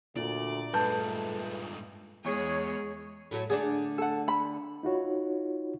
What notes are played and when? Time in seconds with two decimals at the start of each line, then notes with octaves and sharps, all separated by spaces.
0.16 D2 A#2 D5
0.74 G2 G#3 A3 B4 A5 G6
2.25 E2 G#3 G#4 C#5
3.31 A2 F#3 A3
3.50 D3 A3 D4 G#4 D5
3.98 A4 F#5
4.28 B5
4.83 D#4 F4 F#4 C#5